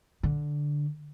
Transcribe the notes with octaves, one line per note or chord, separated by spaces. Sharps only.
D3